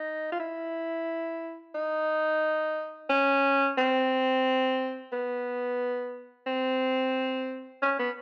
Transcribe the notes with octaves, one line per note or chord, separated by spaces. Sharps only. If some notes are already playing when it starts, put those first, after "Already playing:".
Already playing: D#4
F4
E4
D#4
C#4
C4
B3
C4
C#4
B3